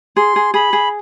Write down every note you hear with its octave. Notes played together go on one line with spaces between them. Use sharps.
G#4 C6
G#4
G#4 B5
G#4